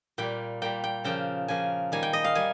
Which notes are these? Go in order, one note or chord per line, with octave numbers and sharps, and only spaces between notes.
A#2 G3 A#3 G5
A#2 G3 A#3 G5
G5
C#3 F3 A#3 G5
C#3 F3 A#3 G#5
D#3 G3 A#3 G#5
G5
D#5
F5
G3 A#3 G#5